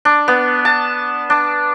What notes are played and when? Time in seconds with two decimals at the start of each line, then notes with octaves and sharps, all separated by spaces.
0.05 D4
0.28 B3
0.65 A5
1.30 D4